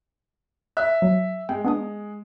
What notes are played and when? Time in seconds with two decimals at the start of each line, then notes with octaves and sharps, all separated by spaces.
0.77 E5 F#6
1.02 F#3
1.49 G#3 G5
1.64 B3 D4 D#6